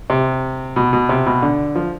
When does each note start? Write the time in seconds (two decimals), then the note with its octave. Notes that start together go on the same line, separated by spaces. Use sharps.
0.10 C3
0.76 B2
0.93 B2
1.09 C3
1.26 B2
1.42 D3
1.76 F3